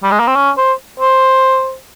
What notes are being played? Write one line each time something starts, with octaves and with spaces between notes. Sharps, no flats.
G3
G#3
A#3
C4
C#4
C5
C5